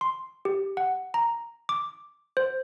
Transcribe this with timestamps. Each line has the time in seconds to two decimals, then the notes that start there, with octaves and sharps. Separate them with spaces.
0.01 C6
0.45 G4
0.77 F#5
1.14 A#5
1.69 D6
2.37 C5